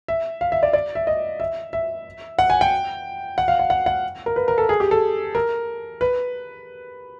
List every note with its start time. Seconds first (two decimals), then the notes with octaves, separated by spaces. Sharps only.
0.08 E5
0.41 F5
0.52 E5
0.63 D5
0.73 D5
0.95 E5
1.07 D#5
1.40 E5
1.73 E5
2.39 F#5
2.50 G#5
2.61 G5
3.38 F#5
3.48 F5
3.59 F#5
3.70 F#5
3.86 F#5
4.26 A#4
4.36 B4
4.48 A#4
4.58 A4
4.69 G#4
4.80 G4
4.91 A4
5.35 A#4
6.01 B4